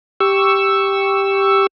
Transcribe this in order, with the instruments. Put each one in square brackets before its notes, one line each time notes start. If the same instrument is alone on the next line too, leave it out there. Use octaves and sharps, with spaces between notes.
[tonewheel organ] G4 C#6 E6